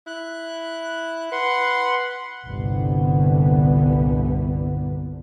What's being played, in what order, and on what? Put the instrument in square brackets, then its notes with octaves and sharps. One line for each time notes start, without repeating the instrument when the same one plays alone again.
[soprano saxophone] E4 [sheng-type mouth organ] F#6
[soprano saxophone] B4 [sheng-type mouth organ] F#5 C6
[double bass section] G1 C2 A#2 D3 B3